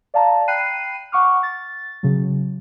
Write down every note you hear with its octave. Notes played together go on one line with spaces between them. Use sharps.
D5 F5 A5 A#5
G5 B5 F#6 C7 D#7
F#5 C#6 D6 F6
A6
C#3 F#3